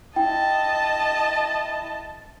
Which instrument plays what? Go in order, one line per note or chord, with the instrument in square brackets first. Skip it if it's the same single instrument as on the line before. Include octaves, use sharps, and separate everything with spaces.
[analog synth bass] E4 [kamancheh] D#5 A5 [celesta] G5